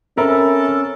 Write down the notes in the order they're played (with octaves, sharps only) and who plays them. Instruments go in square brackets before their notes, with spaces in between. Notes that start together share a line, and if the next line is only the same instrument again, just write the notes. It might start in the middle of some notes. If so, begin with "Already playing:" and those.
[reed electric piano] C4 E5 B5 [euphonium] C#4 [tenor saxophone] A4 [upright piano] A#4